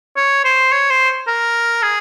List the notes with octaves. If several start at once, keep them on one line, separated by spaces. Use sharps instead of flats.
C#5
C5
C#5
C5
A#4
G#4